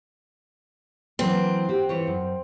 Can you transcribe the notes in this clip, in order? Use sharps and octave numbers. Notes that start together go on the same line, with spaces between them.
E3 F#3 A#3 C4
F#4 G4
E3 F4 C#5
F#2